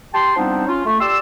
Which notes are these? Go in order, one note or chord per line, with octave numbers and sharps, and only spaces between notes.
G4 G5 A5 C6
F3 G3 B3 C4 D4 D#4
C#4 F4
A3
G4 D5 C6 E6